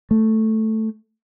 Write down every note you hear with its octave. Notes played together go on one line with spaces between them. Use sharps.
A3